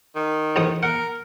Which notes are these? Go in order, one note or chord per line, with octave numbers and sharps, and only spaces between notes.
D#3
A1 G#2 D#6
A#4 F#5